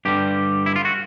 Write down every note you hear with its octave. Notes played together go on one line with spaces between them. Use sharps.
G2 D3 G3 G4
E4
F4
F#4